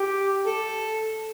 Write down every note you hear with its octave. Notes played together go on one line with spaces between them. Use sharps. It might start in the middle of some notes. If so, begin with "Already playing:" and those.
Already playing: G4
A4